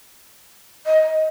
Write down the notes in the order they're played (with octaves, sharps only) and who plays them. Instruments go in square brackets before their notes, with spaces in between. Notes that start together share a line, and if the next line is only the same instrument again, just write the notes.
[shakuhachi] D#5